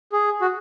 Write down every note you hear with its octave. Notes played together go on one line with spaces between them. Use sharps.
G#4
F#4